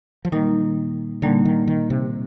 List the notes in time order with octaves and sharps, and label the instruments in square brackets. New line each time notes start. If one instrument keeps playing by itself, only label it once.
[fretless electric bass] F3
[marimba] A#2 G3 A#3 D#4 [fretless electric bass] D#3
[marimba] A#2 G3 A#3 D#4 [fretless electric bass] D3
[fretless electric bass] D#3
D#3
C3